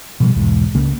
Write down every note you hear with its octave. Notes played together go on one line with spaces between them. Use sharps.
B2 F3 G3
B1 E2 G#2
C#2 C#3 A#3